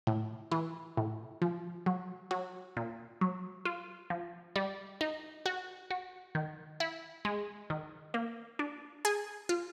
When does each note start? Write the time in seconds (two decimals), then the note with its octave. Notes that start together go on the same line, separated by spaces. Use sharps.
0.07 A2
0.52 E3
0.97 A2
1.42 F3
1.86 F#3
2.31 F#3
2.77 A#2
3.21 F#3
3.65 F4
4.10 F3
4.56 G3
5.01 D#4
5.46 F#4
5.91 F#4
6.35 D#3
6.80 E4
7.25 G#3
7.70 D#3
8.14 A#3
8.59 D4
9.05 G#4
9.49 F4